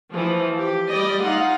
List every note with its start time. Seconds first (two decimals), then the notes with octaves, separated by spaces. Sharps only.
0.12 E3 F3
0.59 G4
0.90 G3 G4 D5 D#5
1.25 D#4 F4 F5 F#5